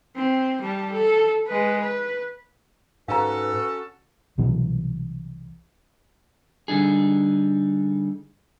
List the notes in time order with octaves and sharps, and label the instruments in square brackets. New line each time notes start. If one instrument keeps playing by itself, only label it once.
[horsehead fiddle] C4
G3 A5
A4
G#3 B4
B4
[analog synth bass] G#2 [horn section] C#4 F#4 A4 [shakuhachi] B4 [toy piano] F5 A#5
[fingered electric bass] C2 B2 E3 F#3
[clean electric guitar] D3 G3 D#4 G#4